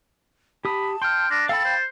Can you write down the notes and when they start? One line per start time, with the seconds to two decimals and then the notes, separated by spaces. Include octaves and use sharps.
0.65 G4 A5 B5 D#6
1.02 G5 C6 F6
1.30 D4 A#6
1.49 A4 F5 G5 B5 A6
1.65 C5